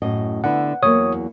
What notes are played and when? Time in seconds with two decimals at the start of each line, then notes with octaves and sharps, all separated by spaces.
0.02 F#2 A2 D#5
0.44 D3 B3 E4 F#5
0.83 E2 F#3 A#3 C#5 D#6